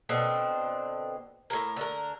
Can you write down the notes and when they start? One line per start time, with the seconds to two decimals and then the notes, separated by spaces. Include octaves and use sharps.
0.09 B2 D3 C4
1.50 A2 A#4
1.77 D3 A#4